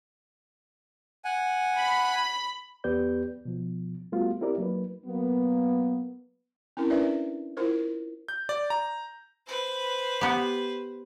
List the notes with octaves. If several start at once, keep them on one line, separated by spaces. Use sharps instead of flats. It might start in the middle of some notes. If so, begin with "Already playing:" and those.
F#5 G#5
B5
E2 B3 G4 B4 D5 G6
B2 F3
G3 A3 B3 F4 F#4
C4 E4 G4 A#4 D5
F#3 A#3 D#4 B4
F#3 A#3 B3
C4 C#4 E4 A#4
C#4 D4 E4 B4 D5 E5
E4 F4 A#4 C5
G6
D5
A#5
B4 C5
B3 G4